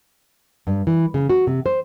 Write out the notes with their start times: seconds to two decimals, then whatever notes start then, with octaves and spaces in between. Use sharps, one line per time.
0.67 G2
0.87 E3
1.14 C#3
1.30 F#4
1.47 C3
1.66 C5